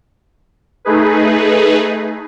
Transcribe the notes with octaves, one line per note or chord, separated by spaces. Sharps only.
A3 D#4 G#4 B4